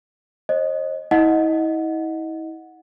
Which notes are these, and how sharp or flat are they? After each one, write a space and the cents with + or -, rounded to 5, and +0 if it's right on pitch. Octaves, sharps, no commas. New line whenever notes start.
C5 +45 D#5 -10
E4 -40 D#5 +0 F#5 -15